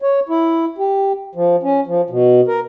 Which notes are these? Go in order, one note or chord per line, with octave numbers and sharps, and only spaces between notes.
C#5
E4
G4
F3
C#4
F3
B2
A#4